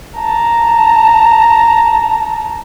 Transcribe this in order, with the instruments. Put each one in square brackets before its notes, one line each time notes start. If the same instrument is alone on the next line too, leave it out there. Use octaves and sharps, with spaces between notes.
[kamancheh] A5 A#5